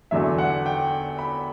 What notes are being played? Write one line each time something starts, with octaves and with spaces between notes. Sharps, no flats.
E2 D3 F#3 E5
F#5
G5
B5